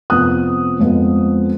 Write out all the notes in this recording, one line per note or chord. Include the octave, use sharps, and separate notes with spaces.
F1 F2 F3 B3 D#6 F#6
F2 F3 G#3 B3